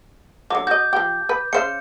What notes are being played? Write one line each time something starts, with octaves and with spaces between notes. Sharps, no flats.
D3 F#3 D6
F#4 D#5 G6
F3 G4
B4
C#3 C5 F5 C#7